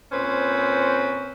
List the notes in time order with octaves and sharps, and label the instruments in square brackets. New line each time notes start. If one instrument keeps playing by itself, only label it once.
[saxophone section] A#2 C4 C#4 B4 C5